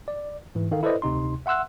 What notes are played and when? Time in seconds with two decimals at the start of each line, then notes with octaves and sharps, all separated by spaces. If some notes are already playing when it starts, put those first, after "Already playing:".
0.08 D5
0.55 G#2 E3
0.71 D#3 A4 F5
0.83 E4 A4 B4 C5 D5 D#5
1.02 D2 C3 D#4 C6
1.46 E5 F#5 C6 E6 F#6